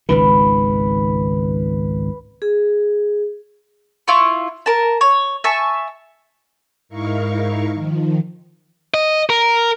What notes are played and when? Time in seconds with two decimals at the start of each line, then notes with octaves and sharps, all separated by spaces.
0.09 G#1 C#2 D#3 B4
2.42 G#4
4.08 E4 F4 C#6
4.66 A#4 A5
5.01 C#5
5.44 E5 G#5 A5 C#6
6.89 G#2 D#4 E4 A#4 F5 C#6
7.74 D#3 F3
8.94 D#5
9.30 A#4